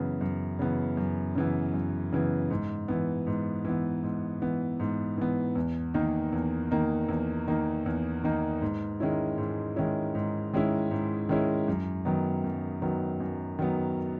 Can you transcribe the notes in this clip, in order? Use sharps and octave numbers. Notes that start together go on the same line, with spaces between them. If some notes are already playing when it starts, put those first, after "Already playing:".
Already playing: F#2 C#3 E3 B3
F#2
C#3 E3 B3
F#2
C#3 E3 B3
F#2
C#3 E3 B3
G#2
E3 B3
G#2
E3 B3
G#2
E3 B3
G#2
E3 B3
E2
D#3 A#3 D#4
E2
D#3 A#3 D#4
E2
D#3 A#3 D#4
E2
D#3 A#3 D#4
G#2
D#3 G#3 C#4 E4
G#2
D#3 G#3 C#4 E4
G#2
D#3 G#3 C#4 E4
G#2
D#3 G#3 C#4 E4
F#2
D#3 F#3 B3
F#2
D#3 F#3 B3
F#2
D#3 F#3 B3